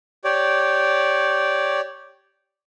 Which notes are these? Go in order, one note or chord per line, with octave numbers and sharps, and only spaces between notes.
G4 C#5 D5